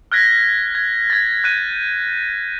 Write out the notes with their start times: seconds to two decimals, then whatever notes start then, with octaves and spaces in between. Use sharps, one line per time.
0.12 F6 F#6 G#6 A#6 B6
0.75 G#6
1.10 G#6 A6
1.44 F#6 G6 D#7